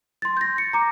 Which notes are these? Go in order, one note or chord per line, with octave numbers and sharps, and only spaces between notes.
C6 A6
G6 A#6
C#7
A#5 D6